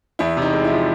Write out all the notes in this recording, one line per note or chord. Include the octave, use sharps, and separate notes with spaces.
E2 E4
C3 D#4
G#3
E4
F3